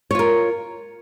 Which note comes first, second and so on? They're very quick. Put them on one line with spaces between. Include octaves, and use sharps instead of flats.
C#5 F4 A#4